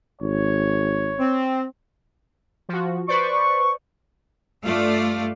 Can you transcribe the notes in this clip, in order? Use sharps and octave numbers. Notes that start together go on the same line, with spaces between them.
G#1 C#5
C4
F3 F#4
B4 C5 D5 C#6
G2 A3 F4 D5 F5